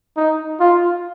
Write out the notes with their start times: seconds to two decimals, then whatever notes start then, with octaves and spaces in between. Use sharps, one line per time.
0.17 D#4
0.60 F4